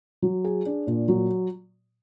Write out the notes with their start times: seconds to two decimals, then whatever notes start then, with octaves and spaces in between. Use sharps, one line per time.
0.22 F#3
0.44 G#4
0.66 D4
0.87 A#2
1.08 F#3